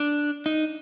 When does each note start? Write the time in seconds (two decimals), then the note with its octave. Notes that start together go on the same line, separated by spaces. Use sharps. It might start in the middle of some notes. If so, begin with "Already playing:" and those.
Already playing: D4
0.46 D#4